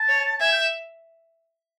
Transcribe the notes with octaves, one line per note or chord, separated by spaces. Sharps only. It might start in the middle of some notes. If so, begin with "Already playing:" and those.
Already playing: A5
C#5
E5 G#5
G5